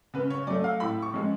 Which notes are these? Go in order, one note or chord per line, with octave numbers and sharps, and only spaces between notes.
C#3 B4
C#5
F#3 A3 D5
F5
A2 B5
C#6
F3 G#3 C#4